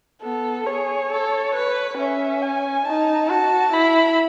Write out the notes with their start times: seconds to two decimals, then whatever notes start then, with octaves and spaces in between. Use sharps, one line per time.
0.23 B3 A4
0.67 G#4 C#5
1.11 A4
1.55 B4
1.98 C#4 E5
2.42 G#5
2.85 D#4 A5
3.29 F#4 A5
3.73 E4 B5